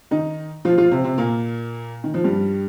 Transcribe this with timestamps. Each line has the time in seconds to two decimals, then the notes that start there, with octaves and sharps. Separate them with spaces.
0.11 D#3 D#4
0.65 F3 F4
0.78 F3 F4
0.91 C3 C4
1.04 C3 C4
1.18 A#2 A#3
2.04 D#3
2.14 F3
2.24 G2 G3